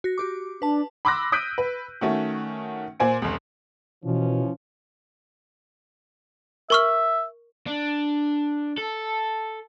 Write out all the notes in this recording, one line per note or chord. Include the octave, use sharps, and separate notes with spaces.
F#4 A#6
F#4 G4 D6
D4 B4 A5
B5 C6 D6 E6 F#6 A#6
D#6 F#6 G6 B6 D7 D#7
B4
D#3 A3 C#4 F#4
A#2 C5 G#5 D7
F1 C#2
B2 E3 F3 C#4
A#4 E5 C#6 F6
D4
A4